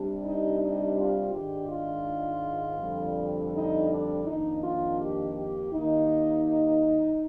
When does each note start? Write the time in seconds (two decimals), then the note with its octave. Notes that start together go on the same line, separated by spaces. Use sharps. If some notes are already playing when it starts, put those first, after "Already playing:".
Already playing: C3 G3 D4
0.23 D#4
0.59 D#4
0.96 F4
1.32 G#2 D#3 G#3 D4 G4
1.68 F4
2.79 F2 D3 G3
3.52 D#4
3.89 D4
4.25 F2 D#3 A#3 D4 D#4
4.62 F4
4.99 G4
5.35 G4
5.72 D#2 D#3 A#3 D#4